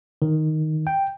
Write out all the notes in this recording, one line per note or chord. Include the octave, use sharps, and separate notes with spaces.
D#3
G5